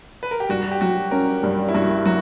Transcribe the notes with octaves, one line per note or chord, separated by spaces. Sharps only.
B4
A#4
G4
G2 F#4
G4
F#3 F#4
C#4 A#4
G2
E4
G2 F#4
F#3 F#4